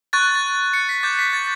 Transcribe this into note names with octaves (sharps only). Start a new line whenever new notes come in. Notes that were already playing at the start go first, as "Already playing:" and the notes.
C#6 F#6 A6
A6
C#7
B6
D6 G6 A6
B6
A6